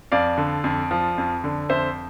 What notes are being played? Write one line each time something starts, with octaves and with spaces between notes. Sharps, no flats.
F2 D5 F5
D3
F2
F3
F2
D3
F2 C5 E5